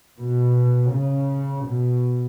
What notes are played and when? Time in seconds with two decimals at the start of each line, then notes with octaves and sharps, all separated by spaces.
0.20 B2
0.92 C#3
1.65 B2